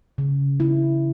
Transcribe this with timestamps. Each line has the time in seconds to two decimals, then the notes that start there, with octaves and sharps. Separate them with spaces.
0.18 C#3
0.60 E4